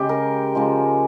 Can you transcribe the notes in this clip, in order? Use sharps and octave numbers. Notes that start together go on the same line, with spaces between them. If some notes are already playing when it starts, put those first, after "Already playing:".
Already playing: C#3 G#3 G4
A#4
C#3 F3 G#3